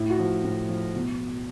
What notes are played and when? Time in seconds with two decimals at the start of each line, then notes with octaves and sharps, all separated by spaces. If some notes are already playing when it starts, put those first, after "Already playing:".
Already playing: A2 E4
0.10 F#4
0.19 F3
0.44 A2
0.69 F3
0.95 B2